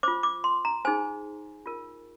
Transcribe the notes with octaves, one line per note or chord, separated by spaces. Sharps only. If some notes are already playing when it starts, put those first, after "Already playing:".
F4 C5 D6
D6
C6
A#5
D#4 G#4 C5 G#5
F4 A#4